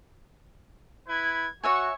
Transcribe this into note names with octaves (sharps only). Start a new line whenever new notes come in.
E4 B4 G#6
F#4 C#5 E5 G#5 C#6